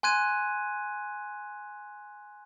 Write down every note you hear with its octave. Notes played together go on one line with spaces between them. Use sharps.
G#5 C6 F#6 G#6 D#7